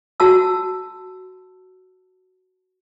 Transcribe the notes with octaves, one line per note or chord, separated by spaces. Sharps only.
F#4 A5 E6